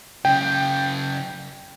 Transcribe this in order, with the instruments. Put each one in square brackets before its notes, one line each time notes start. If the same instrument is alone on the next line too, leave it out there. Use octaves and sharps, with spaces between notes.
[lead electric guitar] F#2 C#3 [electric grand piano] G5